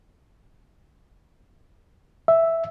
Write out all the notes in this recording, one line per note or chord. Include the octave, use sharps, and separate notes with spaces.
E5